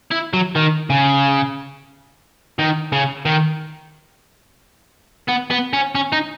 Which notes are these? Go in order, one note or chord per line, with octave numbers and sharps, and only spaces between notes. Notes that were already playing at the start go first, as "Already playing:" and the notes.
E4
F#3
D#3
C#3
D#3
C#3
D#3
B3
B3
C#4
C#4
D#4